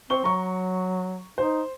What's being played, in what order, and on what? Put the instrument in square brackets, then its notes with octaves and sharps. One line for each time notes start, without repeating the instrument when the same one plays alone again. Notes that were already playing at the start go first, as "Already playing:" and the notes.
[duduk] C4 [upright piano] C5 C#6 G7
[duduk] F#3 [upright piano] A#5 C#6
[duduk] D#4 [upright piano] C5